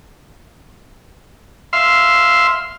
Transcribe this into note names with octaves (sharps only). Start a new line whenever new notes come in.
E5 F5 C6